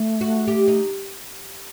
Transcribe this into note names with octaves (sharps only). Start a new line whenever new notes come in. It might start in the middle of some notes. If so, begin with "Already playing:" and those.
Already playing: A3
F#4
G4
D#4